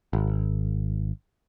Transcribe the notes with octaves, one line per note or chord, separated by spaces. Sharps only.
G#1